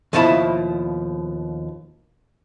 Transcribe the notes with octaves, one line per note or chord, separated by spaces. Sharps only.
D#2 B2 F3 E4 A5 B5